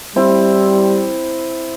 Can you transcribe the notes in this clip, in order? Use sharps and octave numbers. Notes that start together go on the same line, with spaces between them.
G3 C4 E4